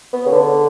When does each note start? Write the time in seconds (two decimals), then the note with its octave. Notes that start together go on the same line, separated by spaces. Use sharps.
0.13 B3
0.26 C#3
0.32 D3